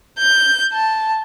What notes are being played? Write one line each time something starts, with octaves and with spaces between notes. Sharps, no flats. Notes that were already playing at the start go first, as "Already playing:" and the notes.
G6
A5